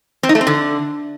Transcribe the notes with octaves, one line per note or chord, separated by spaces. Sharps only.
C4
D#4
A3
C4
D3